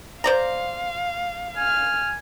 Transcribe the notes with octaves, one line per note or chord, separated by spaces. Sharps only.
C5 D5 F5 A#5
G#5 F6